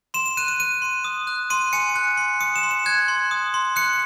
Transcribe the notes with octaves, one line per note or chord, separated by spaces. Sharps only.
C6 E7
E7
F#6 D#7
D#7
F#6 D#7
C6
D#6
F#6
C6 D#7
G#5 C#7
F#6
C6
D#6 C#7
E7
C6
E7
F#6 G#6
C6
D#6
C6
F#6 C#7